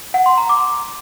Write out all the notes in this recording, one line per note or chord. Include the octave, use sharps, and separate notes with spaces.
F#5
C6
A#5
D6